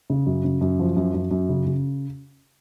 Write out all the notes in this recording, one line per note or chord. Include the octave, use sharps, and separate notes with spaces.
C#3
F#2
C#3
F#2
F3
F#2
F#2
F#2
C#3
C#3